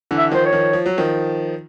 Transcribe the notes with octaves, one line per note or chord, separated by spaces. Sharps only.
D3 E3
E5
D#3 F3 C5
C#5
D#3 F3
F3
F#3
D#3 F3